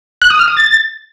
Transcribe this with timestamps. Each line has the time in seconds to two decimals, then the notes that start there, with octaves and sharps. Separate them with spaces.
0.22 F#6
0.30 D#6
0.39 F6
0.48 D#6
0.57 A6